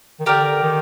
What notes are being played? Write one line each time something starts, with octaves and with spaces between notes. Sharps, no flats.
D#3
D3 G4 A#4 D5 G5
D#3